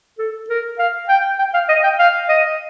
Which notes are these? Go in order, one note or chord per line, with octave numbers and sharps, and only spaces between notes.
A4
A#4
F5
G5
G5
F5
D#5
G5
F5
D#5